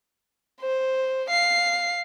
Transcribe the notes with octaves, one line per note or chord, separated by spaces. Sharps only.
C5
F5 C7